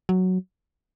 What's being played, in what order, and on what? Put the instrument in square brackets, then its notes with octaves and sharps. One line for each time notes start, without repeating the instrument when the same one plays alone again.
[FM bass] F#3